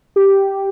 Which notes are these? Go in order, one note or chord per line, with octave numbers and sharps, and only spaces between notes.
G4